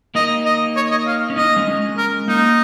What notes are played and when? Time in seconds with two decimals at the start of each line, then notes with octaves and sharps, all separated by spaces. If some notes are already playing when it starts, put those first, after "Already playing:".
0.15 A#3 D#4 D#5
0.46 D#5
0.76 C#5
0.91 D#5
1.07 F5
1.30 C#4
1.36 A#3 D#4 D#5
1.57 G#3 C#4
1.67 G#3 C#4
1.97 A#4
2.28 A#3 D#4